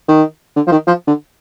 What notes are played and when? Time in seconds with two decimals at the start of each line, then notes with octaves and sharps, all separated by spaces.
0.08 D#3
0.56 D3
0.67 F3
0.71 D#3
0.87 F3
1.07 D3